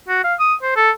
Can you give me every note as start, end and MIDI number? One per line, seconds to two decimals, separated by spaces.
0.08 0.24 66
0.24 0.34 77
0.40 0.54 87
0.62 0.73 72
0.76 0.90 69